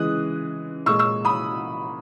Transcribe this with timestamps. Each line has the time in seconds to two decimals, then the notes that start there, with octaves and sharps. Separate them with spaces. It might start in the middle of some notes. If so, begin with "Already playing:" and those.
Already playing: C#3 E3 G#3 D#6 F#6
0.86 A#2 G#3 C#6 E6
0.99 C#6 E6
1.25 B5 D#6